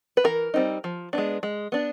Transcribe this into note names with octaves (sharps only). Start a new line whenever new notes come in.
B4
E3 A#4
G3 C4 D#4
F3
G#3 B3 D4
G#3
B3 D4